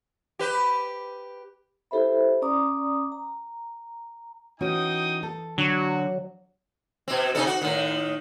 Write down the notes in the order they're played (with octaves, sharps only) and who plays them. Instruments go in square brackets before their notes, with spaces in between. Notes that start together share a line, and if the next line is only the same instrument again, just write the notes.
[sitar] G4 B4
[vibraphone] E4 G4 A4 C5 E5 B5
C#4 D5 A#5 D6 D#6
A#5
[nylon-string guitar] E3 C#4 F#4 [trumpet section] D#4 G5 D#6
[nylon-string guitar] A4
[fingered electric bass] D3 [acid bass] F#3 [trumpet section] F#4
[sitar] B2 C4
C3 D#4 A4
F#4
A2 D#3